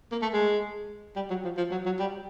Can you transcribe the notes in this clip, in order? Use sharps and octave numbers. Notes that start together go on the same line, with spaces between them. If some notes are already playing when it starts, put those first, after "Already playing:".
A#3
A3
G#3
G3
F#3
F3
F3
F#3
F#3
G3